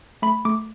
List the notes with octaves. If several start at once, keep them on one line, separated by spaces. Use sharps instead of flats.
A3 B5
A3 D6